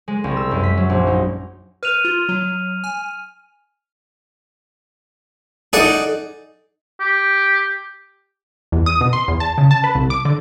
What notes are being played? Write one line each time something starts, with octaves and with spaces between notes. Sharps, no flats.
G#3
C2
E6
F#2
B6
F#3
A#1
D#4
B4 F6 D#7 F7
F4
F#3
G#5
D#4 G#4 A4 D5 F#5
G4
E2
D#6
B2
C6
E2
A5
C#3
A5
B4
C2
D6
D3